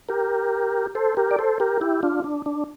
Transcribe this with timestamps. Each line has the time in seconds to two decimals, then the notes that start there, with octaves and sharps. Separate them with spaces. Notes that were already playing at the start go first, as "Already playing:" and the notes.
0.09 G4 A#4
0.95 A4 C5
1.17 G4 A#4
1.31 D5
1.39 A4 C5
1.60 G4 A#4
1.81 E4 G4
2.03 D4 F4
2.24 D4
2.46 D4